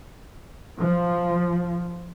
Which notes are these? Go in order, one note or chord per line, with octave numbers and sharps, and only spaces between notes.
F3